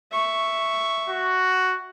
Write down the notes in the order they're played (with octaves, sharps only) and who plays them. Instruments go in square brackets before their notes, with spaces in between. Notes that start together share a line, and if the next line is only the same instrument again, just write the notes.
[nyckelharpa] E5 C#6
[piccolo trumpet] F#4